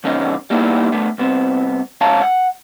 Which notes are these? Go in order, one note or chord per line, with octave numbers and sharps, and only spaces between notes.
E2 G2 C#3 B3 C#4 D#4
G3 A#3 B3 D#4 E4
D3 A3 B3
C2 B3 C4
C#2 C#4 F5 A5 A#5
F#5